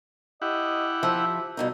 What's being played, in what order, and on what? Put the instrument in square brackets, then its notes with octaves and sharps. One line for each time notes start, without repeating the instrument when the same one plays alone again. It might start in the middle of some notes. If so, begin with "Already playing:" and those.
[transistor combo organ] E4 G4 F#5 [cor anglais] D#5
[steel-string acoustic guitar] F3 [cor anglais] E5
[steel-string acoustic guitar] G2 B2 D#4